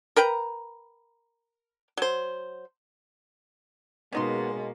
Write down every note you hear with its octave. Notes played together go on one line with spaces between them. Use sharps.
A#4 B4 G5 A#5
F#3 C5
B2 G#3 A#3 B3 C#4 D#4 C6